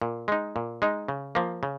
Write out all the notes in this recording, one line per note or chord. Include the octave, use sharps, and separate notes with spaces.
A#2
G#3 D#4
A#2
G#3 D#4
C#3
F3 A#3
C#3